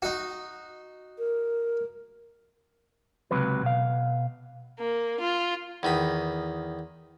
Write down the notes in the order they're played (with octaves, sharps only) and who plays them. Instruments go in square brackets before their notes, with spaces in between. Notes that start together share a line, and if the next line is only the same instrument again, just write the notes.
[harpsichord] D#4 F#4
[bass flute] A#4
[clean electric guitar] C#2 C3 F#3 B4
B2 F5
[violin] A#3
F4
[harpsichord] E2 D#3 B5